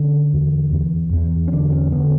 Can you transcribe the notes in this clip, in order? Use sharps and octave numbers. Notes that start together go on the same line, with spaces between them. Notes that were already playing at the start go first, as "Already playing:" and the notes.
Already playing: D3 C#4
E2
E2
E2
C#4
D3 D4
C#4
D3 B3